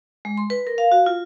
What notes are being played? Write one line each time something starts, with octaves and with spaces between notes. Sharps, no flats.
G#3
C6
B4
A#4
F5
F#4
F4